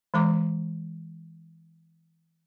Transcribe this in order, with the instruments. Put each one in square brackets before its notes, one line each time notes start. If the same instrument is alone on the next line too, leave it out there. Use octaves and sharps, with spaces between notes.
[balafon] E3 G#3 A#5 D6